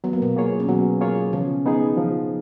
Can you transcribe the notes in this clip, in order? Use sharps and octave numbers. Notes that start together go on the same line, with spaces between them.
F#3 B3
A#3
B2 B3
A#3 F4 G#4 C#5
C#4
B2 F#3 B3
A#3 F4 G#4 C#5
C#3 F3 C#4
B3 D#4 G#4
F3